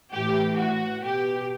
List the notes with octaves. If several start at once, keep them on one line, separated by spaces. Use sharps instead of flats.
A2 E3 G4
F#4
B2 G4